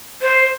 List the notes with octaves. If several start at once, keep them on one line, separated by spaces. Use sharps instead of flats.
C5